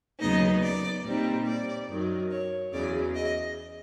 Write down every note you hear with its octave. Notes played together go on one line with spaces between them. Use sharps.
D#2 C#3 F#3 B3 D#4 D#5
D5
A#2 G3 C4 D#4
D5
F#2 D#3 F#3
C#5
E2 C#3 F#3 D5
D#5